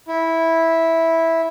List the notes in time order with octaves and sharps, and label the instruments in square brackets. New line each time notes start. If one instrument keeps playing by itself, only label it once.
[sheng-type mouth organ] E4